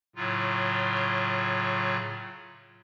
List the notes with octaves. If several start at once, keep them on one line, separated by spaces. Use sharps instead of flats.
A2 C#3 F#3 F4